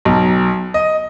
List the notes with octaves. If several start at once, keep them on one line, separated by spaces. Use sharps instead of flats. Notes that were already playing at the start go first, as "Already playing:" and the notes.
B1
D#5